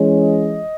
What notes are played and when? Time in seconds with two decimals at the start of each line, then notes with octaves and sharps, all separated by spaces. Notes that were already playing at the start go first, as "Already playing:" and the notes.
Already playing: E3 G#3 C#4
0.18 D#5